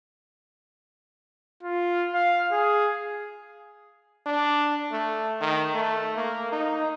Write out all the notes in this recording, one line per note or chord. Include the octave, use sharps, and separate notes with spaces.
F4
F5
G#4
D4
A3
D#3
A3
A#3
D#4